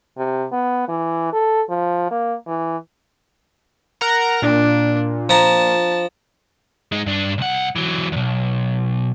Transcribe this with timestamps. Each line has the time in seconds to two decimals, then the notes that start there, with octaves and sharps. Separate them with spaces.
0.17 C3
0.52 B3
0.88 E3
1.32 A4
1.69 F3
2.11 A#3
2.47 E3
4.01 A#4 F#5 A#5
4.42 A#2 D4
5.29 F3 A5 A#5
6.92 G#3 D#4
7.06 G2 D4
7.38 C2 F#5
7.76 E3 F#3
8.12 B1 E2